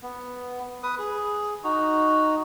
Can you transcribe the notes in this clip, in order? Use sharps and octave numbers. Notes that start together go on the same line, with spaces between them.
B3
B4 D#6
G#4
D#4 F#4